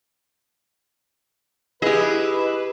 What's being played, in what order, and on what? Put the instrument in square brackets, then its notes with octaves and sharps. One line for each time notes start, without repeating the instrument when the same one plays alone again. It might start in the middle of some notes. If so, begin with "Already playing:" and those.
[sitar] E4 D#5 [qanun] G4 G#4 [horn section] B4